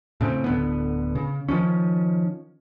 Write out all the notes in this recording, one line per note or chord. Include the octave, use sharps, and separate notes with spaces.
A2 C#3 C4
D1 D3 B3
C#3
D#3 F3 C#4